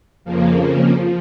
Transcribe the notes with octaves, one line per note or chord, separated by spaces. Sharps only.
F2 C#3 F3 A#3
F3